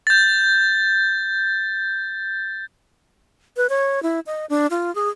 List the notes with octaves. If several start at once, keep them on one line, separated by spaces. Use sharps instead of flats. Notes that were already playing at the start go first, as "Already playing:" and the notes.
G6 A6
B4
C#5
E4
D#5
D4
F4
G#4